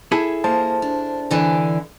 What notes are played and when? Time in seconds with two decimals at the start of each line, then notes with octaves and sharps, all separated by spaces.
0.12 E4 G#4 A4
0.44 A#3 C5 A5
0.82 D4
1.31 D3 E3 D4